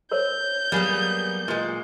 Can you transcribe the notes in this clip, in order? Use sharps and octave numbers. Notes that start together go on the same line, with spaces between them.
A#4 C5 C#5 G6
F#3 G3 A#3 B3 G#4
A#2 G#3